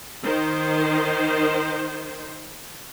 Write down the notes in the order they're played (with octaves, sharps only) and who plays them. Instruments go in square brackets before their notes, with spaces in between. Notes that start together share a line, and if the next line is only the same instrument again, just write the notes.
[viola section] D#3 C5